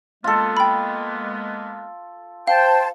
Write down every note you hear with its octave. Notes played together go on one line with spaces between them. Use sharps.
G#3 A#3 B3 F4 A4
G5 B5
C5 F5 G5 A5